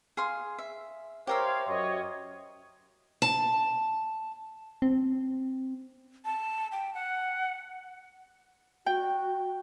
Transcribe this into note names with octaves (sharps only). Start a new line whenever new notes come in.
G#4 F5 C6
E5
G4 A#4 C5 C#5 E5 F5
F#2 C#5 D#5
A5
C4
A5
G5
F#5
F#4 G5